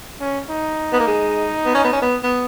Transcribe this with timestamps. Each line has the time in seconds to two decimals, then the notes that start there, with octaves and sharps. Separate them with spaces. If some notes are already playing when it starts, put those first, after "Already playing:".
0.21 C#4
0.50 D#4
0.93 B3
1.00 A#3
1.07 G#3
1.65 B3
1.75 C#4
1.84 B3
1.92 C#4
2.02 B3
2.23 B3